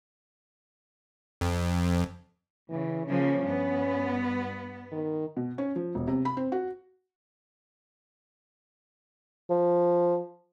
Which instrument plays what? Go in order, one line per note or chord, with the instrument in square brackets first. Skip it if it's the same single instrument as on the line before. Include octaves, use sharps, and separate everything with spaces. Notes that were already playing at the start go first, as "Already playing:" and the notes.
[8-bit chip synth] F2
[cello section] C#3 [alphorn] E3
[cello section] C#3 F3 A#3 [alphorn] C#4
[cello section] G2 B3
[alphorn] D#3
[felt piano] B2
C#4
F3
E1
C3
B5
C4
F#4
[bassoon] F3